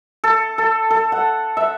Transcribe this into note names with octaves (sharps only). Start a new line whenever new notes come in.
A4
A4
A4
F#5
E5